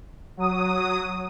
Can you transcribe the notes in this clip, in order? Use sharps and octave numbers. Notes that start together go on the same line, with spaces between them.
F#3 D#6